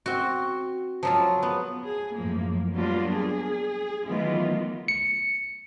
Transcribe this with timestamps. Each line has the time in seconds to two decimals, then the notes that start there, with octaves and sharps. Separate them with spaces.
0.06 C4 F#4
1.03 F3 F#3 F4
1.43 B3
1.84 G#4
2.14 F#2 A2 F3 A#3
2.73 F#3 G3 A#3 B3 D4 F4
3.13 G#4
4.05 D#3 E3 F#3 A3 B3 F4
4.88 C#7